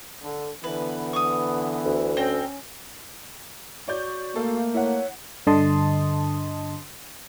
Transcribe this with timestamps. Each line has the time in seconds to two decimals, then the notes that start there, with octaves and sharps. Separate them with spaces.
0.23 D3
0.64 D3 E3 B3 B4
1.13 C#6 D#6
1.85 D2
2.17 C4 C#4 G5 A#5
3.88 F#4 C#5 D5 G6
4.36 A3 A#3 A4 F5
4.74 E4 C#5 F#5
5.47 G2 D3 D#5 A5 C6 D#6